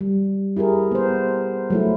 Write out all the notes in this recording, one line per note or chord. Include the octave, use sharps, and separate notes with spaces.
G3
E4 G4 G#4 A#4
B3 C5
F#3 A3 E4